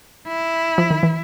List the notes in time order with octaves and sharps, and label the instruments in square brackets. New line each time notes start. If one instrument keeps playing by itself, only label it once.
[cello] E4
[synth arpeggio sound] F3
D#3
E3